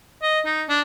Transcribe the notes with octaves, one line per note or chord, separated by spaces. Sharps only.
D#5
D#4
D4